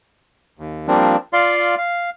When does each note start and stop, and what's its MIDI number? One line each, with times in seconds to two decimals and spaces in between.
0.59 0.87 39
0.88 1.16 53
0.88 1.16 55
0.88 1.16 58
0.88 1.16 60
0.88 1.16 62
1.33 1.75 65
1.33 1.75 74
1.33 1.75 77
1.33 1.75 84
1.77 2.10 77